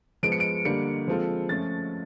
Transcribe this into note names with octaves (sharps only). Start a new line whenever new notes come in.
F3 G#3 B3 D7
C#7
D7
D3 G3 A#3 C#7
F3 G#3 C4 F4 A4
F3 A3 C#4 A6